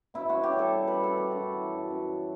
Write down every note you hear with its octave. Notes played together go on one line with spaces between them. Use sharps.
B2 E4
C#4 F#4
G4
G3
A4
B2
B4
G3
A4
G3
G4
F#2 F#4
E3
F#2
F#2